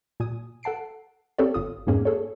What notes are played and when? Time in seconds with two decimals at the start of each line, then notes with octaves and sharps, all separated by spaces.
0.20 A#2 G#5 D#6
0.63 A4 F#5 A5 C7 D7
1.39 C4 G4 A4 C#5 D5
1.54 G1 F4 D#6
1.87 F2 G#2 A#3 C#4 G#4
2.05 G#4 A4 C#5